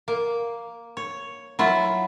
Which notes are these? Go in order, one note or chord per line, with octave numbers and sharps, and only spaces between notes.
A#3
C#5
F#3 E4 F4